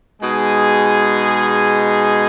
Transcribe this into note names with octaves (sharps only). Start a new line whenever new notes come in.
B2 G#3 D#4 G#4